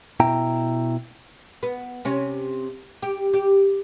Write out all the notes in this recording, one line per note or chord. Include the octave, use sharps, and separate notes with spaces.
B2 E4 G5 A#5
B3
C3 C#4
G4
G4